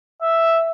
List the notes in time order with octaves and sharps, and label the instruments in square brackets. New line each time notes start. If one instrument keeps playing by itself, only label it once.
[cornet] E5